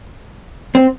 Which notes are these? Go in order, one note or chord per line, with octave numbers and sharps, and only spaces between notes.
C4